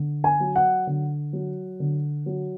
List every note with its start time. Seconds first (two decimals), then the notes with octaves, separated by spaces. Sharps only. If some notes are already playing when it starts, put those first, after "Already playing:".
Already playing: D3
0.24 G#5
0.40 F#3
0.56 F#5
0.87 D3
1.33 F#3
1.80 D3
2.26 F#3